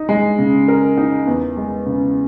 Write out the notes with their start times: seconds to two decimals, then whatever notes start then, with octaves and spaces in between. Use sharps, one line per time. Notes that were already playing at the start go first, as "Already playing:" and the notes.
Already playing: D#4
0.09 G#3
0.39 C#3
0.68 A#4
0.97 D#4
1.27 E2
1.57 G#3
1.86 C#3